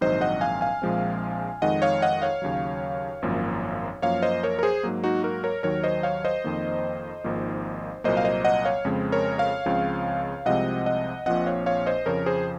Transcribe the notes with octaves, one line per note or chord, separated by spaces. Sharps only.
A#1 G#2 D#3 F#3 C4 C5 D#5
D#5 F#5
F5 G#5
F5 G#5
A#1 A#2 F3 G#3 C4
F2 D#3 G#3 D#5 F#5
C#5 F5
D#5 F#5
C#5 F5
D#2 C#3 F#3
G#1 F#2 F3 A#3
F#2 F3 A#3 C#5 F5
C5 D#5
A#4 C#5
A#4
G#4 C5
G#2 F#3 A#3
D#4 F#4
F#4 A#4
A#4 C#5
D#2 D#3 F#3 A#4 C#5
C5 D#5
C#5 F5
C5 D#5
F2 D#3 A#3
G#1 G#2 F3 A#3
C2 A#2 F#3 A#3 C5 D#5
F5
C5 D#5
D#5 F#5
C#5 F5
F2 C#3 G#3 C4
A#4 C#5
C#5 F5
C#2 C#3 F3 G#3 C4
C2 C3 F3 G#3 C4 D#5 F#5
D#5 F#5
A#1 A#2 F3 C4 D#5 F#5
C#5 F5
C#5 F5
C5 D#5
F2 C#3 F3 A#4 C#5
G#4 C5